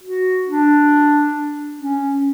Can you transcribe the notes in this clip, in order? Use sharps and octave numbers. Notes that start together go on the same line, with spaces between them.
F#4
D4
C#4